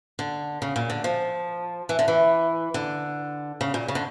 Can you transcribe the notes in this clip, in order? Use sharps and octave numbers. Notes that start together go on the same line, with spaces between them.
D3
C#3
A#2
D3
F3
E3
D3
E3
D3
C#3
A#2
C#3
D3